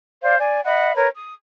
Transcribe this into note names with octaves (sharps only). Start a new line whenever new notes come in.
C5 D5 F5
D5 G#5
D#5 E5 F#5 B5
A#4 B4 C#5
D#6